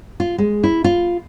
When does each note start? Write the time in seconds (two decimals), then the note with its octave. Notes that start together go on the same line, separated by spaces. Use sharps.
0.20 F4
0.38 G#3
0.64 E4
0.84 F4